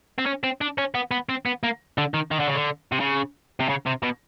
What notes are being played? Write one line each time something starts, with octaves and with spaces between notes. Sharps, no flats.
C4
C#4
C4
D4
C#4
B3
B3
C4
B3
A#3
D3
D#3
D#3
D3
C#3
D3
C3
C#3
C3
C#3
C3
B2